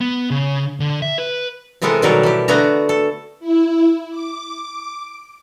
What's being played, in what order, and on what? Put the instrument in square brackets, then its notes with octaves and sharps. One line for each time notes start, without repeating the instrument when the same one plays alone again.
[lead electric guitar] B3
C#3
D3
E5
B4
[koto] C3 E3 G#3 B3 A4 A#4
B2 D#3 F#3 G3 A4 A#4
E3 G4
D3 A3 B3 F#4 A#5
A4
[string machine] E4
D6